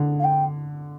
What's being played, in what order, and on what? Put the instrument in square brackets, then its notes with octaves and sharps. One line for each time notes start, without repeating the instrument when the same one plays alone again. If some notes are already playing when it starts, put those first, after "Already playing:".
Already playing: [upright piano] D3
[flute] F5
G5